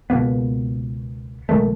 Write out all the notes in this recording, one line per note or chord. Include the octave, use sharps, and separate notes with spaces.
C#2 B2 A#3 B3
B1 D#3 G#3 A3